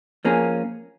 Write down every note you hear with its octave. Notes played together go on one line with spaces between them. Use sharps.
F3 A#3 C#4 G#4